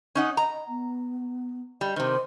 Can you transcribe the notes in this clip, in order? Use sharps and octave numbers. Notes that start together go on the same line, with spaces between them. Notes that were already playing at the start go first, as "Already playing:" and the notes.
C#4 D#4 F#5
D#5 A#5
B3
G3 D#5
C3 D#3 C5